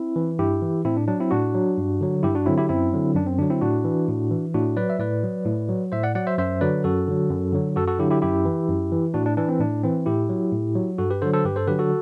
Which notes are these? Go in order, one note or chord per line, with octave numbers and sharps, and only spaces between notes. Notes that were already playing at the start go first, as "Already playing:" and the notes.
Already playing: C4 E4
E3
G2 E4 G4
E3
A2 C4 E4
D4
F#3 D4
C4 E4
A2 D4 F#4
F#3
G2
D3 F#3
G2 E4 G4
D4 F#4
D3 F#3 C4 E4
E4 G4
F#2 C4 E4
D3 F#3
F#2 D4
C4
D3 F#3 D4
C4 E4
A2 D4 F#4
E3
A2
E3
A2 D4 F#4
F#3 B4 D5
E5
A2 B4 D5
F#3
A2
F#3
A2 C5 E5
D5 F#5
F#3 D5 F#5
C5 E5
F#2 C5 E5
D3 F#3 B4 D5
F#2 F#4 A4
D3 F#3
F#2
D3 F#3
F#2 F#4 A4
F#4 A4
D3 F#3 E4 G4
E4 G4
F#2 E4 G4
E3
F#2
E3
A2 D4 F#4
D4
E3 D4
C4
A2 D4
E3 C4
A2 E4 G4
F#3
A2
F#3
G2 F#4 A4
G4 B4
D3 F#3 A4 C5
A4 C5
G2 G4 B4
A4 C5
D3 F#3 G4 B4
F#4 A4